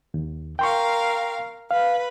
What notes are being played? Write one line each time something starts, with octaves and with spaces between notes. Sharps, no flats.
D#2
A#4 F5 G5 C6 C#6
B4 F5